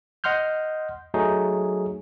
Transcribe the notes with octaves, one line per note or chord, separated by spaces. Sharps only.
D#5 F#5 C6 F6 G6
F#3 A3 D#4 G#4